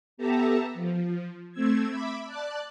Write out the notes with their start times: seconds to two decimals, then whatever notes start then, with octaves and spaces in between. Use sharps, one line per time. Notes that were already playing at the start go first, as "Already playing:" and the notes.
0.17 B3 G4 A4 E5 A5 A#5
0.74 F3
1.52 A3 C4 E6 G#6
1.89 E5 B5 D6
2.24 D5 A5 F#6